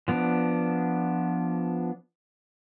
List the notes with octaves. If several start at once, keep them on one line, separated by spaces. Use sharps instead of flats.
F3 B3 D4